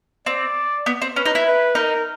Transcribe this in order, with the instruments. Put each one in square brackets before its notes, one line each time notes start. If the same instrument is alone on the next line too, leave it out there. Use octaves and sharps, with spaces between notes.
[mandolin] C4 [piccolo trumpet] D5
[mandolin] B3
C4
[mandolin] C#4 [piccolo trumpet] B4
[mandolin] D#4
E4
[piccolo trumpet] B4
[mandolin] D#4 [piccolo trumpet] A#4